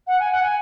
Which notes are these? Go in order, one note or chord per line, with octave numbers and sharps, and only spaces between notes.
F#5
G#5
F#5
G#5